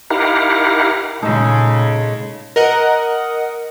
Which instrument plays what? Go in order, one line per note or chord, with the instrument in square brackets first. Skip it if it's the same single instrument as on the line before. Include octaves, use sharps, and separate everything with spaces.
[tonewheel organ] D#4 E4 G4 A#4 F5 F#5
[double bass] A#2 [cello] C#3 G#3 [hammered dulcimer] D#4 A4
[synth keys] A#4 D#5 F#5